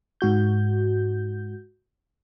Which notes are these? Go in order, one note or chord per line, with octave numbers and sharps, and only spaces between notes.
G#2 F#4 G6